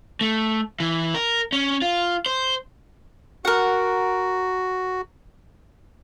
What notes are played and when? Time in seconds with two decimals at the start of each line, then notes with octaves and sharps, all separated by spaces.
0.21 A3
0.80 E3
1.15 A#4
1.52 C#4
1.82 F4
2.26 C5
3.45 F#4 A#4 F#5